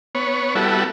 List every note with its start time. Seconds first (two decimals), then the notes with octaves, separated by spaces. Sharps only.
0.15 B3 C#5
0.55 G3 B3 E4 F#4 A4